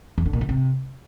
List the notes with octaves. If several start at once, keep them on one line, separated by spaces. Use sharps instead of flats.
E2
D3
A#2
D3
C3